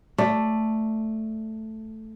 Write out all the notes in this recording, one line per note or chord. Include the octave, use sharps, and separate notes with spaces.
A3 D5